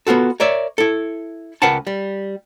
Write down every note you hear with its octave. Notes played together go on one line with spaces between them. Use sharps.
B3 F4 F#4 A4
A#4 C#5 D5 E5
E4 A4
C#2 A#4 B4 F#5 G5 A5
G3